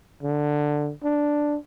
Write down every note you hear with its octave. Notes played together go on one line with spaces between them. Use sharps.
D3
D4